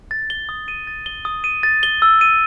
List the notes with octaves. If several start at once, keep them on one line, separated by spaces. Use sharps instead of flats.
A6
G7
D#6
D#7
A6
G7
D#6
D#7
A6
G7
E6
D#7